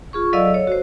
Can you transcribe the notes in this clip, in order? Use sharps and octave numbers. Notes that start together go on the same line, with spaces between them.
F4 G#4 C#6
F#3 A4 D5 D#5 F5 E6
C#5
F#4 C5